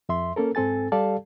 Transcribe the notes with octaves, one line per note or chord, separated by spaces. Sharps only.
F2 E5 C6
A#3 C#4 A4 A#4
G#2 C4 A4 G#5 A6
G3 G4 A4 D5 F5 A5